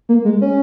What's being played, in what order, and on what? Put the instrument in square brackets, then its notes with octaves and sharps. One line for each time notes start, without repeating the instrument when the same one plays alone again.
[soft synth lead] A#3
G#3
C#4